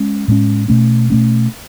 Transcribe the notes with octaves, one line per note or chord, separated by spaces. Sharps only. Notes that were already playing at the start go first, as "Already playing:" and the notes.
Already playing: G#3 C#4
A2 G#3 C#4
B2 A3 C#4
B2 A3 C#4